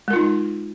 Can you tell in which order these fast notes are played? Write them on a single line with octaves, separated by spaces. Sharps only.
G#3 A#4 F4 D#4